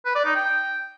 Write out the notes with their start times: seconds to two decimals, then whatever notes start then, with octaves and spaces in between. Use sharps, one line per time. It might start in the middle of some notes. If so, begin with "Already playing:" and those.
0.06 B4
0.16 D5
0.25 D#4
0.35 G5